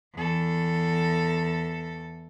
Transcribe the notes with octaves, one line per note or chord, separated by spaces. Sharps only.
E2 A4